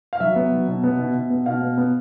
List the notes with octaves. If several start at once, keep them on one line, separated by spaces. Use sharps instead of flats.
F5
F#3 E5
B3
F#3
B2
B3
B2
B2
B3
B2 F5
B3
B3